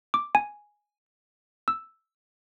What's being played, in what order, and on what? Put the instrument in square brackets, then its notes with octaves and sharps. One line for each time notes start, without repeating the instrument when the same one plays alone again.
[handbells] D6
G#5
E6